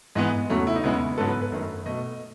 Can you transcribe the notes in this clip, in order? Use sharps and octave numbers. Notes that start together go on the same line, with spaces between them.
G#2 E3 G#3 B3 D#5
E2 C#3 F#3 A3
E4
D#4
E2 C#3 G#3 B3 E4
G#2 F#3 B3 A4
B4
B4
F#2 D#3 A3
B2 A3 D#5